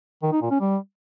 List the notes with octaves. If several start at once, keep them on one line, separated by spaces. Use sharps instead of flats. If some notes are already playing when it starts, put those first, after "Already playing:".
D#3
D#4
A#2
C#4
G3